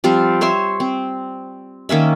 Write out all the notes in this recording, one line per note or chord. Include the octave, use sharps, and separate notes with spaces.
F3 G3 C4 F5
C5 C#5 E5 C6
C4
D#3 A#3 C#4 E5